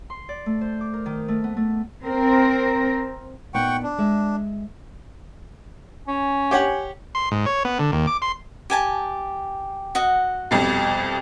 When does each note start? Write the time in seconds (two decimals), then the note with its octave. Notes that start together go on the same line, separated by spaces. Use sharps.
0.10 C6
0.29 D5
0.46 A3
0.61 C5
0.81 D6
0.94 A#4
1.06 D#3
1.28 A3
1.44 B3
1.57 A3
2.04 C4 A#4
3.54 A#2 B3 D#4 F#5 G5 C#6
3.83 D4
3.99 G#3 E5
6.08 C#4 G#5
6.51 G4 C#5 F#5
7.15 C6
7.31 G#2
7.46 C#5
7.65 B3
7.79 D3
7.92 D#2
8.07 D6
8.22 C6
8.70 G4 G#5 A5
9.95 F#4 D#5 F#5
10.51 C2 F2 B2